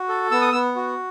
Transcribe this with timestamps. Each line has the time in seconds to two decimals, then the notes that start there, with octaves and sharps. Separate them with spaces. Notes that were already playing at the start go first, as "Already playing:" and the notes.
Already playing: F#4
0.09 A4
0.31 B3 E6
0.41 D#6
0.52 B3 E6
0.76 F#4